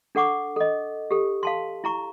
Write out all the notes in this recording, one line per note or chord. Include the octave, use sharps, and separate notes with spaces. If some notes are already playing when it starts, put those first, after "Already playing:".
D4 A4 F#5 C#6 D6
A4 D#5
G4 A4
F5 A5 C6
E4 A#5 C#6